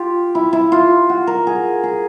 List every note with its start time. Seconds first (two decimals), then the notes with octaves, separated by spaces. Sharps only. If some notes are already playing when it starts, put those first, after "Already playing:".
Already playing: F4 G4
0.35 E4
0.53 E4
0.72 F4
1.10 F#4
1.27 A#4
1.47 G#4
1.83 G#4